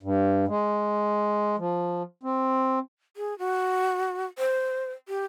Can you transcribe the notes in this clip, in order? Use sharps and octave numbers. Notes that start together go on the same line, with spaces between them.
G2
G#3
F3
C4
G#4
F#4
C5
G4